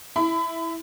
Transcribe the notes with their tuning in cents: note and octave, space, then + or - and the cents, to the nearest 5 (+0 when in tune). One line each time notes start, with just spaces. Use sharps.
E4 +0 B5 +35